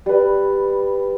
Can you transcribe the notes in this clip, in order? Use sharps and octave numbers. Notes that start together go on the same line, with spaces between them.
G3 B4